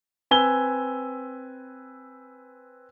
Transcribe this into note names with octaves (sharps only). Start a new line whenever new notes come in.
C4 B4 G#5 E6 G7